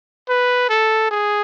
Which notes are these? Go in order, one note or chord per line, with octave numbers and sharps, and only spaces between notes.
B4
A4
G#4